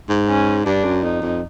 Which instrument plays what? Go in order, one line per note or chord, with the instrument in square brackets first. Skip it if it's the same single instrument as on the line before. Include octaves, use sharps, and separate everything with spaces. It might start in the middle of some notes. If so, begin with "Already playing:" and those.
[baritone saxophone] G#2
[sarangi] C#4
[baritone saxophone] G2 [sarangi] D4
[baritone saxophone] F#2
[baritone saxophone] F2 [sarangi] D#4
[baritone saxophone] F2